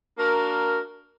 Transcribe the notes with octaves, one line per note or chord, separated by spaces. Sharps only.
A#3 D4 F#4 A#4